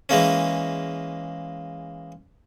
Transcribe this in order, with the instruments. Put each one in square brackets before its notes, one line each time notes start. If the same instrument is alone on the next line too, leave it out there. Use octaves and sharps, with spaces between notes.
[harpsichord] E3 G#3 A#3 C#4